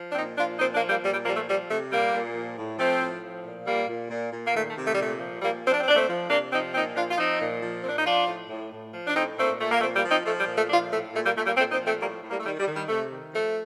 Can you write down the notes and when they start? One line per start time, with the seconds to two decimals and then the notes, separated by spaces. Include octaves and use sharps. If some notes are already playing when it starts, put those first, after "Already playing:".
Already playing: F3
0.10 D4
0.15 A#2 C4 D#4
0.37 F3 D4 F4
0.59 A#2 C4 D#4
0.74 A#3 D4
0.81 F3
0.89 G3 A#3
1.03 A#2 G3
1.14 G3
1.25 F3 G3 A#3
1.36 A3
1.47 F3 G3
1.69 C3 A3
1.90 A#2 G3 A#3
2.14 A#2
2.35 F3
2.58 A2
2.78 F3 A3 C4
3.01 A2
3.23 F3
3.44 A#2
3.66 A#2 G3 A#3
3.88 A#2
4.10 A#2
4.33 A#2
4.47 A#3
4.55 D#3 A3
4.70 A3
4.77 C3
4.84 A3
4.92 G3
4.98 A#2 A3
5.20 F3
5.42 A#2 G3 A#3
5.64 F3 C4
5.72 D4
5.80 C4
5.86 A#2 D4
5.96 A3 C4
6.08 F3
6.30 C3 A#3 D4
6.52 F3 C4 D#4
6.74 A#2 C4 D#4
6.95 F3 D4 F4
7.10 F4
7.18 F3 C4 D#4
7.40 A#2
7.62 F3
7.80 A#2 C4
7.89 D4
7.98 D#4
8.06 F3 D4 F4
8.27 A2
8.50 A2
8.72 A2
8.94 F3
9.07 D4
9.15 A2 C4 D#4
9.38 A#2 A3 C4
9.59 A#2 A3
9.71 A#3
9.81 F3 A3 C4
9.96 G3 A#3
10.04 F3
10.10 C4 D#4
10.25 F3 A3
10.40 G3
10.47 A#2
10.55 A3
10.69 F3 D4 F4
10.91 A2 A3
11.13 A#2 A3
11.24 G3 A#3
11.36 A#2 A3
11.46 G3 A#3
11.57 A#2 A3 C4
11.72 C4 D#4
11.79 F3
11.86 A3 C4
12.00 A2 G3 A#3
12.23 A2
12.30 G3 A#3
12.40 A3
12.45 D#3 G3
12.59 G3
12.68 D#3
12.75 G3
12.88 C3 A3
13.10 D#3
13.33 F3 A3